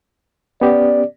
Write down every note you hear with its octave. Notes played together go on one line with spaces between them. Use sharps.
B3 C#4 G4 D5